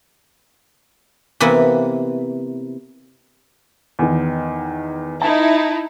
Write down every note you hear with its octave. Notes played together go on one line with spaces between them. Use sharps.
C3 E3 A#3 B3
E2 D#3
D#4 E4 A5